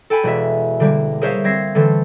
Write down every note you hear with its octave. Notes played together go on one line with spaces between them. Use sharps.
A4 G5 G#5 B5
E1 F#4 E5
D3 G3 A#3
G#4 A#4 C5 C#5 E5 F5
G3 C4 G#6 A#6 C7
D3 E3 A3 C4